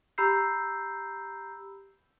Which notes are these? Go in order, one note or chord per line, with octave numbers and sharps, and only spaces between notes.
G4 A#5 B5 E6 G6 C7